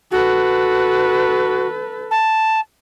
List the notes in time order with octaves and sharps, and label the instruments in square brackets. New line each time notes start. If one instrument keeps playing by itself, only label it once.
[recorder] F#4 [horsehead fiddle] A4 B4
[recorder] A5